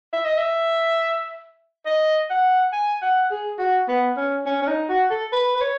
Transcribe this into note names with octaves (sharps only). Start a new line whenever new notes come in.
E5
D#5
E5
D#5
F#5
G#5
F#5
G#4
F#4
B3
C#4
C#4
C#4
D#4
F#4
A4
B4
B4
C#5